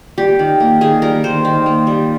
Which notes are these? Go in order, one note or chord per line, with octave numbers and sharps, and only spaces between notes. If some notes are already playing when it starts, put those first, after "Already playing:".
G3 G4
D#3
A#3
D#3 G#4
G3 A#4
D#3 C5
D#3
A#3
G3